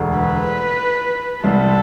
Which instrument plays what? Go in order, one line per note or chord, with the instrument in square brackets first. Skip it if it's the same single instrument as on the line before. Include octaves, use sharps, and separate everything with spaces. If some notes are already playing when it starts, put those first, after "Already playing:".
Already playing: [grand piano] E1 D2 D3
[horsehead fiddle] B4
[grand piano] C2 C3 G3 [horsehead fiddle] A4